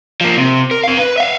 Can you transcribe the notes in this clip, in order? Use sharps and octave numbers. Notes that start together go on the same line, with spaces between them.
F3 A#3
C3
A#4
C4 F5
B4
E5 F5